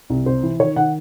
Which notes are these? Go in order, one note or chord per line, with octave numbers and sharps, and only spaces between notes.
C2
C3 C5
E3
D#3 C#5
D#3 F#5